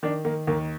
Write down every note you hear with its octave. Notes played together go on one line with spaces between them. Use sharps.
D#3 D4
D#3 A#3
D#2 A#3